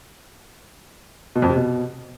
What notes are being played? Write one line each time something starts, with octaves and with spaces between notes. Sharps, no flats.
B2
F2
C3
B2